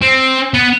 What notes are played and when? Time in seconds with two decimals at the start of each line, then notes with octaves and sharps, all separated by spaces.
0.03 C4
0.54 B3